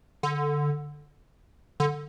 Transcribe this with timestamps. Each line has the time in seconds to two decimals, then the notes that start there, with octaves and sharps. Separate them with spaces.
0.23 D3
1.80 D3